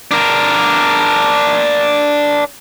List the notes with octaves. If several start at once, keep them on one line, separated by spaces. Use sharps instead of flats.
D4 A#4